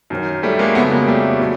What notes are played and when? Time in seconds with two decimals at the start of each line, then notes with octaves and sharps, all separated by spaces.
0.10 F#2 D#3 F#3
0.43 G3 A3
0.59 G#3 A#3
0.75 F2 C#3 F#3 A3 B3
0.91 G#3 A#3
1.07 G3 A3
1.40 A#2 F#3